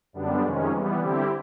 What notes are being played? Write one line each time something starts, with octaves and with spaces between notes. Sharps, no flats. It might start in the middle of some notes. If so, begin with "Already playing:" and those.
F#2 D3 G3 B3 D4
F2 C3 D#3 G#3 C#4
E3 G3 B3
D3 G3 C4 E4 G4